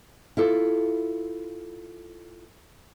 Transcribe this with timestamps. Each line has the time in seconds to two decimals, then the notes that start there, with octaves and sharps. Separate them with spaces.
0.37 E4 F4 A4